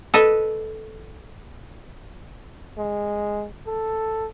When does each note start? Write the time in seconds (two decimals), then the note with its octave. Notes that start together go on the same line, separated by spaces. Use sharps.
0.14 A4 B4 D#5
2.78 G#3
3.67 A4